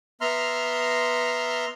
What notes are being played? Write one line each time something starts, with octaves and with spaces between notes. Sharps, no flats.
B3 E5 A#5 C6 F6